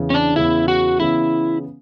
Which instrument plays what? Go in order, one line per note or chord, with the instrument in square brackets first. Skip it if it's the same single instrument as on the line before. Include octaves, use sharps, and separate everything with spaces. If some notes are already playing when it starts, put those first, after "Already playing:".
Already playing: [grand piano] E2 C#3 E3 B3
[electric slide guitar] C#4
D4
[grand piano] E2 C#3 E3 B3 [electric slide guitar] E4
[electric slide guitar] F#4
[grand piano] C#3 E3 B3 [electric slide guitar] E4